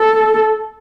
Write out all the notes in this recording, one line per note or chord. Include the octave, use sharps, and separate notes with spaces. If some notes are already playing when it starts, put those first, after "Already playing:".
Already playing: A4